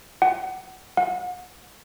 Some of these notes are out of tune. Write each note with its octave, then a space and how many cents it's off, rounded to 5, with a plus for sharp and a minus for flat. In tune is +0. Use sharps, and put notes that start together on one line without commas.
F#5 +25
F#5 -35